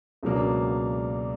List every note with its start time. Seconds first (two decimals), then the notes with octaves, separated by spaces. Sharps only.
0.23 C#2 B2 F#3 A#3 D4